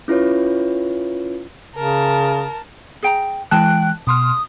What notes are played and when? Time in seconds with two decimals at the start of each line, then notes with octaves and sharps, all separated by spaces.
0.08 C#4 E4 F4 B4 C#5
1.76 C#3 A#4 A5
3.03 G#4 G5 A#5
3.51 E3 G#3 G5 A5 F#6
4.07 B2 C6 D#6 F6